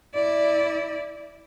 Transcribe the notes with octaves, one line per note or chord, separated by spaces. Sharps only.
E4 D5